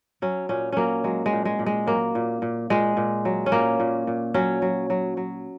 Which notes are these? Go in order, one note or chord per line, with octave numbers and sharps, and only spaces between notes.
F#3 C#4
A#2 C#4
F#3 A#3 C#4
F#3 G#3
G#3
A#2
G#3
A#2
G#3
F#3 A#3
A#2
A#2
A#2 G#3
A#2
F#3
C#4
A#2 A#3
A#2
A#2
F#3 C#4
F#3
F#3
F#3